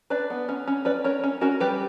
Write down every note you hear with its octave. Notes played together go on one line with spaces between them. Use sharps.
D4 B4 D5
B3
C#4
C#4
C#4 B4 D5
C#4 A#4 C#5
C#4
C#4 F#4 A#4
G3 G4 B4